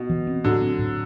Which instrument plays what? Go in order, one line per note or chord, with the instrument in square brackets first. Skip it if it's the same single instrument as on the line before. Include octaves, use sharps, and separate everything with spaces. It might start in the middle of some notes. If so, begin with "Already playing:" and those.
Already playing: [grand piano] B2
[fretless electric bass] E3
C4
[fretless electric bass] A2 [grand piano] D3 F#3
[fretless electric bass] C4
A2